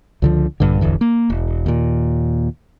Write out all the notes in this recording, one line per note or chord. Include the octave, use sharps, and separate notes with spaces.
C#2 D3 F3
A#1 G2 D3
D1 G1 E2 D3
A#3
E1
D#2 A#2